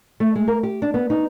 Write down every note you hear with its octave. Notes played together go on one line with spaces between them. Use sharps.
A3
G#3
A#4
G4
D4
B3
D#4